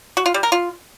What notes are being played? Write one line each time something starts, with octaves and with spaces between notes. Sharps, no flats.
F#4
F4
G3
A#4
F4